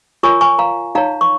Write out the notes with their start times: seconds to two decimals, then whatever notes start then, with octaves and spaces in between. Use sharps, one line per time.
0.23 F4 A#4 C#5 G#5 C#6
0.41 G#5 C#6
0.59 F5 A#5
0.95 D#4 C#5 F5 A#5
1.21 C#6